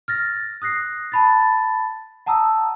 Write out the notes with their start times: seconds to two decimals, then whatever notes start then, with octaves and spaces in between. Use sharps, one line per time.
0.08 F6 A6 A#6
0.62 D#6 F#6 A#6 C7
1.12 A5 B5 A6
2.26 F#5 A5 A#5 D#6 E6